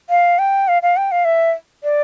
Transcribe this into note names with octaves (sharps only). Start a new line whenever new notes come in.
F5
G5
F5
F5
G5
F5
E5
D5